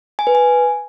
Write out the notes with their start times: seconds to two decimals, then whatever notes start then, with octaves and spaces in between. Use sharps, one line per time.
0.19 G#5
0.27 B4
0.35 G#5